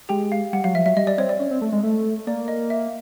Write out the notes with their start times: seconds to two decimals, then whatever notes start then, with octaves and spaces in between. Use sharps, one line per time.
0.09 G#3 G4 G5
0.32 F5
0.53 G3 F#5
0.64 F#3 F5
0.74 F3 E5
0.86 F#3 E5
0.96 G3 D#5
1.07 D5
1.18 C4 C#5
1.29 D5
1.39 C#4
1.51 C4
1.61 A3
1.72 G#3
1.83 A3
2.27 A#3 D5
2.48 D#5
2.70 E5